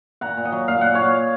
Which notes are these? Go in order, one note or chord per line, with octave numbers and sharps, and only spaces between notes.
A#2 F#5 A#5
A#2
D#5 F#5
F#3
A#2 F5
A#2 F#5
A#2 C#5 F5